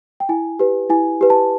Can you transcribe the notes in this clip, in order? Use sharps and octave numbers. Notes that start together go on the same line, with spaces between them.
G5
E4 G#5
G4 B4
E4 G#5
G4 B4
A5